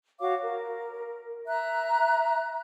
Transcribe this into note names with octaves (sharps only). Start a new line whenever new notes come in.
F#4 C#5 F5 D6
A#4
E5 A#5 F#6